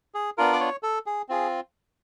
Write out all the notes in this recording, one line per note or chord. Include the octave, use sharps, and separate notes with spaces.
G#4
B3 D4 F4 A#4
D5
C#5
A4
G#4
C4 F4 G#4